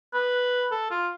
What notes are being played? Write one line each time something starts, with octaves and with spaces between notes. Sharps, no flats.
B4
A4
F4